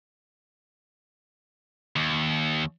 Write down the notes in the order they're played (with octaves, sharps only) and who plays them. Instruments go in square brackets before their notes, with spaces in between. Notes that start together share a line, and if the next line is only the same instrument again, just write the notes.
[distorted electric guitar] D#2